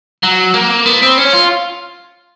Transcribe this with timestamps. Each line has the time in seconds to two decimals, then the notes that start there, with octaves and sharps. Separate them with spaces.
0.23 F#3
0.54 A#3
0.86 B3
1.02 C4
1.18 C#4
1.33 F4